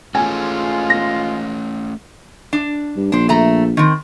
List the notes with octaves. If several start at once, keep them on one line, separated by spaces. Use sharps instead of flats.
G#2 G#3 A3 C#4 F4 G#5
A#6
D4
G2
A#1 D4 C5
A3 A#5
D#3 C4